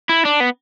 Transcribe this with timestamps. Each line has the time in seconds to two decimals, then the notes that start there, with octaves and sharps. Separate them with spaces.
0.09 E4
0.25 D4
0.40 B3